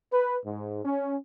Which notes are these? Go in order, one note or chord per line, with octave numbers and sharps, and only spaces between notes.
B4
G#2
C#4